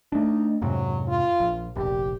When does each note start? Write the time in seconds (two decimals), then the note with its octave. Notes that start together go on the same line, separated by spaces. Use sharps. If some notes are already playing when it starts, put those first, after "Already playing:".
0.12 A3 D4 D#4
0.61 F2 G#2 C3 F#3
1.08 F4
1.40 A#1
1.76 F1 A#1 G4